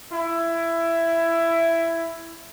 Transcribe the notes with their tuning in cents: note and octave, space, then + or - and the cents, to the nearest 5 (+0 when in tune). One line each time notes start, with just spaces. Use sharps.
E4 +15